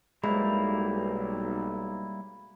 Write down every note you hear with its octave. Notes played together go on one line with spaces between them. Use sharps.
B1 G3 G#3 A#3 E4 B5